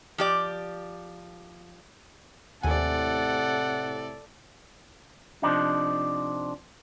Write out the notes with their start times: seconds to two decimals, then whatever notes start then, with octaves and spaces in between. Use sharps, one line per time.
0.18 F3 G4 D5
2.63 D#2 A2 C3 A4 D5 F#5 G#5
5.42 C3 F3 D4 D#4